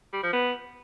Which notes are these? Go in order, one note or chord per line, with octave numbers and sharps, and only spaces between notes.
G3
F3
B3